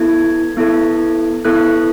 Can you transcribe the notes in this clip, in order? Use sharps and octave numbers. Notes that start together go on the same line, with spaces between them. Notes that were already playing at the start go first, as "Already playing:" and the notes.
Already playing: B3 E4 A4 G#6
B3 E4 A4
B3 E4 A4 F#6